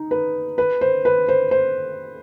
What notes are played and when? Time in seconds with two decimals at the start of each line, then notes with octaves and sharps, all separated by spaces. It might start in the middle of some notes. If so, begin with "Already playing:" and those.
Already playing: D#4
0.11 B4
0.58 B4
0.81 C5
1.05 B4
1.29 C5
1.51 C5